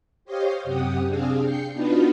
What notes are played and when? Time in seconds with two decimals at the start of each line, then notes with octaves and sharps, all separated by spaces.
0.25 G4 C5 C#5 D#5 F5 C6
0.64 F#2 C3 G4 F#5 G5 D#6
1.06 C3 C4 D4 G#4 F5
1.42 G5 G6 C7 C#7
1.73 B3 D4 D#4 F4 F#4 B4